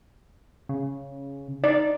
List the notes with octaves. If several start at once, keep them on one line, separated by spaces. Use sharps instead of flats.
C#3
D#4 D5